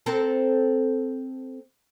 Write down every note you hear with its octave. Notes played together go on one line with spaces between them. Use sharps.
C4 A4 A#4